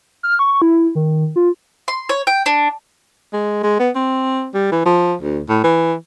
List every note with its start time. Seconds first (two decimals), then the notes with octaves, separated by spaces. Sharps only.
0.23 F6
0.39 C#6
0.62 E4
0.95 D#3
1.36 F4
1.88 C6
2.09 C#5
2.27 G5
2.46 D4
3.33 G#3
3.63 G#3
3.80 B3
3.95 C4
4.54 G3
4.72 E3
4.85 F3
5.22 D2
5.49 A2
5.64 E3